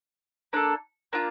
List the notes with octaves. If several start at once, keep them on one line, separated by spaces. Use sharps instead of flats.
A#3 D4 A4
A#3 D4 F4